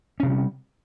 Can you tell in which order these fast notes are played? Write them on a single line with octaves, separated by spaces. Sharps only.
C#4 C3 F#3 G3